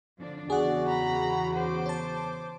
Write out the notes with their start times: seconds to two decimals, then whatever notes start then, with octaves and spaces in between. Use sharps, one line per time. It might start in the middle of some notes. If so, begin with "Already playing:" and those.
0.19 D3 F3 D4
0.50 E2 C#3 F#4 G#4 D5 F#5
0.88 A#5 B5
1.54 C5 D6
1.86 C#5 A5